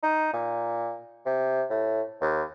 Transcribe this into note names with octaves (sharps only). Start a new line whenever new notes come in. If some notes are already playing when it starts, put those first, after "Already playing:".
D#4
A#2
C3
A2
D#2